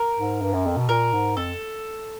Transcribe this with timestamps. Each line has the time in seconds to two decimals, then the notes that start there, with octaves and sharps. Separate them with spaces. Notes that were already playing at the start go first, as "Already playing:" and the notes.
Already playing: A#4
0.18 G#2
0.42 G2
0.53 F#2
0.66 F2
0.77 B2
0.89 A#2 A#4
1.13 G#2
1.37 F2 A4